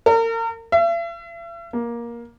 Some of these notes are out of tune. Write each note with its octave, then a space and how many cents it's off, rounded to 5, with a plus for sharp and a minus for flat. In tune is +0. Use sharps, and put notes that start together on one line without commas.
A#4 -35
E5 +45
A#3 +15